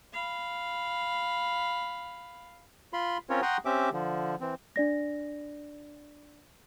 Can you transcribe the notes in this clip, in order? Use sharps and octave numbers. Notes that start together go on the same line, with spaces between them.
F5 B5
F4 B5 C6
C4 C#4 F4 A#4 C#5
F#5 G5 A#5 C6 C#6 D#6
C4 C#4 G4 E5 D6
D3 F3
E3 C4
D4 D5 A#6